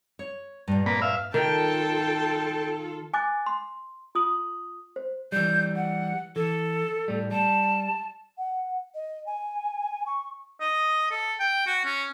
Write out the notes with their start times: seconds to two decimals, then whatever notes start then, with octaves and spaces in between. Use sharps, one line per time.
0.19 C#5
0.68 G2 A#2
0.86 A#3 B4
1.02 E5 F5
1.34 D#3 F4 A4 G5 A5
3.14 G#5 D6 F#6 A6
3.46 C6
4.15 F4 D#6 F#7
4.96 C5
5.32 E3 G3 G6
5.76 F#5
6.36 E3 A4
7.08 A2 G3
7.31 G3 A5
8.37 F#5
8.94 D#5
9.26 G#5
10.06 C#6
10.61 D#5
11.11 A4
11.40 G5
11.67 F#4
11.85 C#4